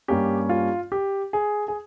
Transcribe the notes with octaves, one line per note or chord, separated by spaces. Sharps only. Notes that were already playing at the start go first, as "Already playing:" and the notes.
G2 G3 A#3 C#4 G4
F4
G4
G#4
G#4